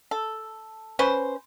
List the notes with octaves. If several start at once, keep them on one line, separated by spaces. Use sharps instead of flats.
A4
C#4 B4 C5